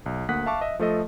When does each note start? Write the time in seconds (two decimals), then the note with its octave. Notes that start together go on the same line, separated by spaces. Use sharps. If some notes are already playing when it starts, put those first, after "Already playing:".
0.06 B1
0.29 D2 A#3 F#5 D#6 F#6 B6
0.46 E5 F5 A5 C#6 D6
0.61 D#5 E5
0.79 F3 A3 A4 D#5